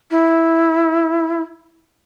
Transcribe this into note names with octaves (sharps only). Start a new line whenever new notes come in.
E4